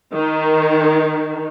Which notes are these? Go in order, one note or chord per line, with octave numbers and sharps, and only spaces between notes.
D#3